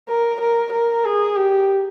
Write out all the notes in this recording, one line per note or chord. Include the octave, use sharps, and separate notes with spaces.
A#4
A#4
A#4
G#4
G4